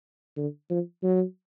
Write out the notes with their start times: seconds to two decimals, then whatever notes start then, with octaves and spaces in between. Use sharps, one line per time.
0.37 D3
0.70 F3
1.03 F#3